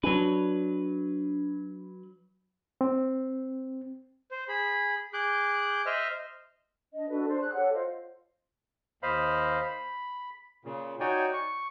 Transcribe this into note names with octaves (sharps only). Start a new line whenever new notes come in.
F#3 C#4 D4 B4
C4
C5
G#4 B5
G#4 D6 F#6 G6
C5 D#5 E5 F6
D4 D#5
D4 F#4 A4 B4
D4 C5 D5
G#4 F#6
G4 A4 C#5 F#5
F4 C5 D#5 F5
D#2 C5 D#5 F5 B5
B5
A#2 C#3
D#4 F#4 C#5 D5 G5 G#5
C#6